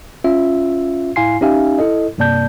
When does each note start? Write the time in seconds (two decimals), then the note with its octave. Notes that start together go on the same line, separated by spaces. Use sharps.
0.24 C#4 F4 E5
1.16 A2 E4 F5 G#5 C6 C7
1.41 C#4 D#4 G4 E5 F5 G#5
1.79 E4 A4 D#5
2.18 G2 C3 A#3 D5 A5 G6